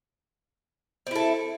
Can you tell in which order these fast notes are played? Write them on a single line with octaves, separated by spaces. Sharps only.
C4 E4 A4